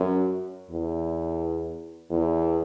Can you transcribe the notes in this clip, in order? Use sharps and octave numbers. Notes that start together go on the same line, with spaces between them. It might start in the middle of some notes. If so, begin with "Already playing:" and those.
Already playing: F#2
E2
E2